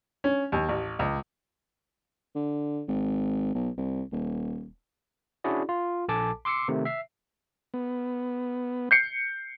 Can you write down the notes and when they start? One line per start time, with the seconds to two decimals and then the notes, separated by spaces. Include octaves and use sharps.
0.24 C#4
0.52 D#2
0.69 A1
0.99 C#2
2.35 D3
2.88 G#1
3.55 B1
3.77 C2
4.12 D#1
5.44 C#4 D4 E4 F#4 G#4 D5
5.69 F4
6.08 A#1 A4 G#5 A5 D6
6.45 C6 D6 E6 C7 C#7
6.68 C3 D#3 A3
6.85 E5 C7
7.74 B3
8.91 G6 C7 C#7